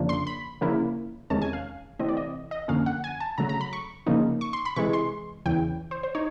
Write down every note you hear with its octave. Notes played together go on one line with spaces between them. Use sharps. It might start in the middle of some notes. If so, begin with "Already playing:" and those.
Already playing: F2 C#3 F3 A#3 D4
C6
B5
C#3 F3 A#3 C#4 E4
E2 C3 D#3 G#3 C#4 A5
G#5
F5
C3 E3 A3 C4 D#5
D5
D#5
D#5
F#2 D3 F3 A#3 C#4 F5
F#5
G#5
A5
C#3 F#3 A3 A#5
A#5
B5
C#6
C#3 F3 A#3 D#4
C#6
C6
B5
C3 E3 G#3 C#6
C6
E2 C#3 E3 G5
C5
C5
D#4 C#5